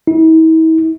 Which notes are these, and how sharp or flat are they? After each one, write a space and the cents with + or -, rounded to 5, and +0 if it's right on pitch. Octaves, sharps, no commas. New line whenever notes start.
E4 -45